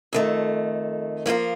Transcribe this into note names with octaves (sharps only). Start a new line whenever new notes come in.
F2 D#3 A3
F3 A#3 F4 A#4